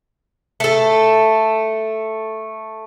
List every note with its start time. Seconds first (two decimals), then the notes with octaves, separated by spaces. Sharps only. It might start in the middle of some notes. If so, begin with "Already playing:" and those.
0.60 A3 A4